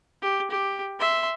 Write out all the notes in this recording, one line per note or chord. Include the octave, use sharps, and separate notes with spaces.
G4
G4
E5 C6